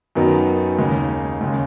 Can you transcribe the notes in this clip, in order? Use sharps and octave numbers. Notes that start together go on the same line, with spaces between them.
F#2 D#3 F#3 B3 D#4
D#2 C#3 G#3 D#4
D#2 C#3 G#3